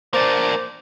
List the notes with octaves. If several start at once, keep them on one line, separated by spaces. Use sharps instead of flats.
A#3 D4 C5 D6 A6